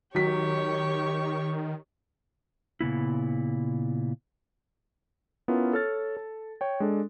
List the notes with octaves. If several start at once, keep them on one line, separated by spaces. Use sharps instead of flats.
D#3 F#3 G4 C#5 C#6 B6
A#2 C#3 B3 E4
B3 C#4 E4 F4 A#4
A4 C#5 F6 A6
A4
C#5 G5
G#3 D4 A4